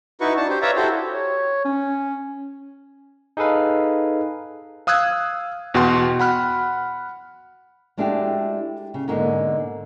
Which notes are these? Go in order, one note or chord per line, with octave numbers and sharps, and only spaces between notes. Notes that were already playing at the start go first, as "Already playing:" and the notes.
D#4 E4 F#4 B4 C#6
D4 A5
G4 C5
B4 C#5 D5 E5 F5 A#5
E4 F#4 G4 A4 C5
C#5
C#4
D#4 G#4 A4 B4 F5
F5 D#6 E6 F#6 G#6
E2 B2 F#4 F#5 G5 C6
F#5 B5 F6 F#6
G#3 A3 D4 E4 F#4 G4
C#3
G#2 B2 D3 G#3 A#3